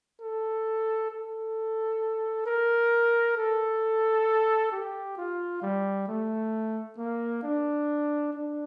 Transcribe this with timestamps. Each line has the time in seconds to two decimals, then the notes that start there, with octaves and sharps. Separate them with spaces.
0.22 A4
1.11 A4
2.46 A#4
3.37 A4
4.72 G4
5.17 F4
5.62 G3
6.08 A3
6.98 A#3
7.43 D4
8.33 D4